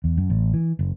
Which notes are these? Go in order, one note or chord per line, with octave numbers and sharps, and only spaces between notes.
E2
F#2
A1
E3
F#1